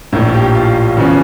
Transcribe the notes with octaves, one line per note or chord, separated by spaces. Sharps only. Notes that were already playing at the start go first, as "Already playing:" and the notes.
A#1 A2 F3 A#3 A#4
G4
F4
E2 C#3 F3 C#4